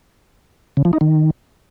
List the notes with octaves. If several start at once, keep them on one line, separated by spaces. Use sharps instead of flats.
C#3
F3
D#4
D#3